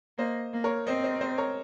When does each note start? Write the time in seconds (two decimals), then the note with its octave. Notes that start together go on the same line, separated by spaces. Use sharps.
0.18 A#3 C5 D#5
0.53 A#3
0.64 A#4 C#5
0.87 C4 C5 D#5
1.04 C5 D#5
1.21 C5 D#5
1.38 A#4 C#5